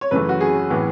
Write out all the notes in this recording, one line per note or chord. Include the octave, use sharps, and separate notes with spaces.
C#5
F#2 C#3 E3 A3 B4
F#4
G#4
A2 E3 B3